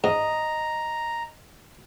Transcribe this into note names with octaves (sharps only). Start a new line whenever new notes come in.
G#2 D#5 A#5